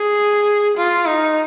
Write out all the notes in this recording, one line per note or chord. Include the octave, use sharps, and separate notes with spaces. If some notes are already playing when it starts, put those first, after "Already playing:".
Already playing: G#4
F4
D#4